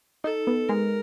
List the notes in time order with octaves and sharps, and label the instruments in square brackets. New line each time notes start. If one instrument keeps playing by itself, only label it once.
[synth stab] D#4 [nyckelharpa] A4
[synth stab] B3
[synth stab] G#3 [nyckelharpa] A#4